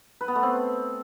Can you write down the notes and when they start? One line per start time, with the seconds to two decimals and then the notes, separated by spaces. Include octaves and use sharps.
0.21 B4
0.28 B3
0.35 A3
0.43 C4